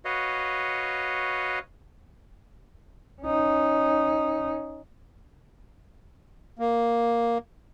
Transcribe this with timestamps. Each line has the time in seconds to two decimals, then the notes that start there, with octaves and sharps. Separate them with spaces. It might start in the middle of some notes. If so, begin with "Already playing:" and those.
0.05 F#4 B4 C#5 D#5 F5
3.23 C#4 D#4
6.59 A#3